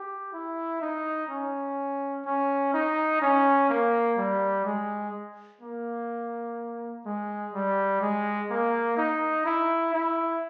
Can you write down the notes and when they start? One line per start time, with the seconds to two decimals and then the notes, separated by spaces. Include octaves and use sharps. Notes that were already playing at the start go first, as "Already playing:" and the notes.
Already playing: G4
0.33 E4
0.81 D#4
1.30 C#4
2.26 C#4
2.74 D#4
3.22 C#4
3.69 A#3
4.18 G3
4.66 G#3
5.62 A#3
7.05 G#3
7.54 G3
8.02 G#3
8.50 A#3
8.97 D#4
9.46 E4
9.94 E4